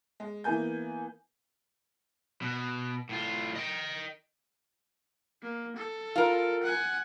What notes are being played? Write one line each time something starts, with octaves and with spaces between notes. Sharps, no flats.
G#3
E3 A#3 B3 G#5 G6
B2
A2 F4
D#5 G5
A#3
A4
F4 A#4
F#5 G#5